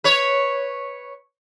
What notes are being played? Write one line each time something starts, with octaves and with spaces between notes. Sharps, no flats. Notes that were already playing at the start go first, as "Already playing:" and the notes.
B4 C#5